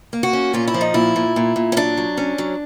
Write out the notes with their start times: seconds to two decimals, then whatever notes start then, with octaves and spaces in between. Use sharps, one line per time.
0.13 A#3
0.23 F#4
0.33 C#4
0.54 A#2 F4
0.68 E4
0.74 F3
0.81 D#4
0.94 A#2 E4
1.16 A#2
1.36 A#2
1.56 A#2
1.72 C#4
1.76 F#3 D4
1.97 F#3
2.17 C#4
2.38 F#3